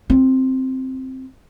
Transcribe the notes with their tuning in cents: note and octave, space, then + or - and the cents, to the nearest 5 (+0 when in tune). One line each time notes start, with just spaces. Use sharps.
C4 +0 F4 +0